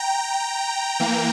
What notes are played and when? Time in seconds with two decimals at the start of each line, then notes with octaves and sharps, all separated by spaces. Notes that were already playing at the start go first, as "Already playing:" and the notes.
Already playing: G5 A#5
1.00 E3 A#3